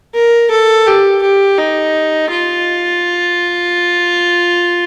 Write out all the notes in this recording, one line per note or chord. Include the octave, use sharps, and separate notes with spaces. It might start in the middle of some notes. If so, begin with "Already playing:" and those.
A#4
A4
G4
G4
D#4
F4